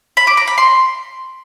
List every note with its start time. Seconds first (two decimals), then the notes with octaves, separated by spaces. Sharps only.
0.17 B5
0.27 D6
0.37 A#5
0.47 B5
0.58 C6